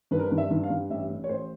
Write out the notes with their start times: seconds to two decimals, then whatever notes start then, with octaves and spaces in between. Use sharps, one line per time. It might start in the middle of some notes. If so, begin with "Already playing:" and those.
0.11 G2 B4
0.19 A#4
0.26 B4
0.32 G2
0.38 E5
0.50 G2
0.63 F5
0.70 G2
0.90 A1 E5
1.10 A1
1.24 C#5
1.29 A1 C5